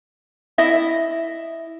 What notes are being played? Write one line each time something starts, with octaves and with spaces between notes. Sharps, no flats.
E4 D#5 E5